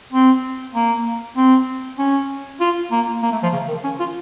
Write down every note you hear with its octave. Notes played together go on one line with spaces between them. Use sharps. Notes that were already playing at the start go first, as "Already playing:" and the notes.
C4
A#3
C4
C#4
F4
A#3
A#3
A3
F3
C#3
D#3
C#4
F4